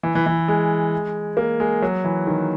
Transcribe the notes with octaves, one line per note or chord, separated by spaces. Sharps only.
E3
E3
E3
G#3
A#3
G#3
F#3
E3
D#3